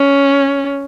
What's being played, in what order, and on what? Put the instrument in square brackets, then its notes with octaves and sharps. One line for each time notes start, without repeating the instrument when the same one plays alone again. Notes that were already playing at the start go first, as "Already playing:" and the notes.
Already playing: [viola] C#4